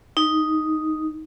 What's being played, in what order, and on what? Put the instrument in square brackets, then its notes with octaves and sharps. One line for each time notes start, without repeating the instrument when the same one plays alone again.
[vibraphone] D#4